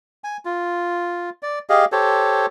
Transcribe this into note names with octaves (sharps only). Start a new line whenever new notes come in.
G#5
F4
D5
G4 G#4 D#5 F5
G4 A4 C5 C#5